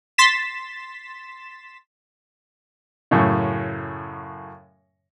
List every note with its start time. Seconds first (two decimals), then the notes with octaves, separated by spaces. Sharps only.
0.18 C6 A6 B6 E7
3.11 F#2 A2 C#3